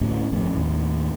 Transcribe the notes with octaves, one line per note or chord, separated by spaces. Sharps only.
D1 D2 A2 C#4
G#1 F2 A3 C#4
D#2 A2